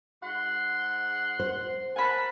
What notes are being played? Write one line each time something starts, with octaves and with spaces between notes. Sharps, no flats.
G#2 F#5 C6
C5
A#4 F#5 G#5 A5 B5